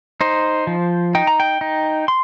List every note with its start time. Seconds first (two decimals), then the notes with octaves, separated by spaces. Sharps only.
0.21 D#4 C5
0.67 F3
1.15 D#4 G5
1.27 A#5
1.40 G5
1.61 D#4
2.08 C6